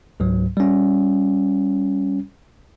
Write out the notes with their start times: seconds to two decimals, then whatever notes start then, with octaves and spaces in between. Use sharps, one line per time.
0.20 C#2 G#2 F#3
0.57 G3 C#4